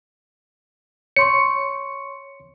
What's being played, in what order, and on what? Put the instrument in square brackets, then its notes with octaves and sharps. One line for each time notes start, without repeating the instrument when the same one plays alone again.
[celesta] C#5 C6 C#6 [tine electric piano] C#7